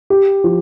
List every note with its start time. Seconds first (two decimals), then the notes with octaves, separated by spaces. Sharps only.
0.10 G4
0.44 F3